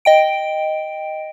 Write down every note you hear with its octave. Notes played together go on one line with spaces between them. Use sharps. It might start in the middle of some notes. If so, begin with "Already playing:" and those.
D#5 G5 D7